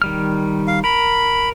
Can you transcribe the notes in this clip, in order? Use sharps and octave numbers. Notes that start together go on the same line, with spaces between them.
D#3 G3 F6
F5
A#4 B5